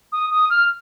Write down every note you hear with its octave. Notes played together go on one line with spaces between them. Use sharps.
D#6
D#6
F6